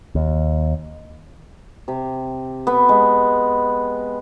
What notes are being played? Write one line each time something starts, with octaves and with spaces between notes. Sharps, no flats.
D#2
C3
B3
G#3